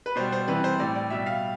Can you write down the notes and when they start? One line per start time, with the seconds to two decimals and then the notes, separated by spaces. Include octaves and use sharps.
0.06 B4
0.16 B2 G3 C5
0.32 C5
0.48 C3 E3 G3 B4
0.64 C5
0.79 A2 G3 D5
0.95 D5
1.10 B2 G3 E5
1.26 F5